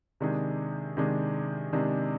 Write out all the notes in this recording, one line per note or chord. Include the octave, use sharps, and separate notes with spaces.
C3 D#3 G#3 D4 G#4
C3 D#3 G#3 D4 G#4
C3 D#3 G#3 D4 G#4